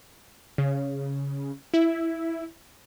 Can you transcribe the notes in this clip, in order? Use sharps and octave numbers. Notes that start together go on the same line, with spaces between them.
C#3
E4